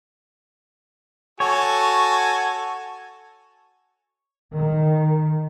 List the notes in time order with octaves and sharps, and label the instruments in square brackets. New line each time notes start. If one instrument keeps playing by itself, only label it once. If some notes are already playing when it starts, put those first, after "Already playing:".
[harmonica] F#4 A4 G#5 [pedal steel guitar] C#5
[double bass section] D#3